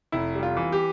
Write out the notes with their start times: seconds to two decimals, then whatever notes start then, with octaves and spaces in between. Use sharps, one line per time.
0.12 F1 E4
0.35 G3
0.43 F4
0.57 E3
0.72 G4